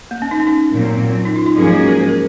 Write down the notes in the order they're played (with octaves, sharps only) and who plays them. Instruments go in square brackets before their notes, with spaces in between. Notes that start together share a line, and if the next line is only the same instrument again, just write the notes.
[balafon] A#3
C#4
D#4
C#4
D#4
[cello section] A#2 F#3 C4
[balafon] C#4
D#4
F4
D#4
[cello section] G#2 F3 A#3 C#4 G#4 [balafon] F#3
[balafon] G#3
F#4
A#4
C5
A#4